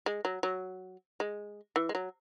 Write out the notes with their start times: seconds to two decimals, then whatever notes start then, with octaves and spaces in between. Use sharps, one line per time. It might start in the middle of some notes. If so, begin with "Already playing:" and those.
0.06 G#3
0.25 F#3
0.43 F#3
1.20 G#3
1.76 E3
1.89 G#3
1.95 F#3